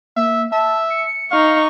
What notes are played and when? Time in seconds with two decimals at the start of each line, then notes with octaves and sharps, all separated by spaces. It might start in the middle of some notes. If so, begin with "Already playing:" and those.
0.16 A#3 E5
0.52 E5 A5
0.90 C#7
1.31 D#4 F5 C#6